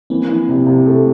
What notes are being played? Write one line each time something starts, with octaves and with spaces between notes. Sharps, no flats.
E3 A#3 C4
E3
C3
C3
A3